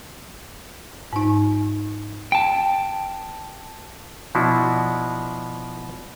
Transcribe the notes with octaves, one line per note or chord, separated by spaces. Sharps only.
G#2 D#4
G5 A5
B2 F3 D4 E4 F#4